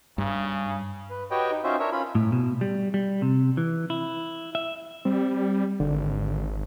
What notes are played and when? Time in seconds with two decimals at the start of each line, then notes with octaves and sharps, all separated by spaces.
0.18 G2 C#3
1.10 B4
1.31 F#4 G4 B4 C#5 D#5 G5
1.51 D#4
1.64 C#4 D#4 F4 F#4 C5 E5
1.80 D4 A#4 C#5 E5
1.92 C#4 F4 B5
2.15 A2
2.32 B2
2.61 G3
2.94 G3
3.22 C3
3.57 E3
3.90 E4
4.55 E5
5.05 G3 C4
5.80 G#1 D3